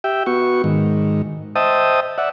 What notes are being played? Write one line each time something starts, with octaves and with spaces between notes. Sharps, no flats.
G4 E5 G5
B3 F#4 C#6
G#2 D#3
C5 D#5 E5 G5 A5 D#6
D5 E5 F#5